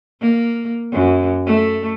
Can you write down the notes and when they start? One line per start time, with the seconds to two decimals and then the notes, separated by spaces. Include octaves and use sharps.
0.21 A#3
0.93 F#2
1.46 A3